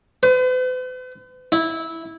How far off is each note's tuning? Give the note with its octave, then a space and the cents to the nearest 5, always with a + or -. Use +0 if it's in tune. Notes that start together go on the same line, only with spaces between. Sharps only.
B4 +45
E4 -15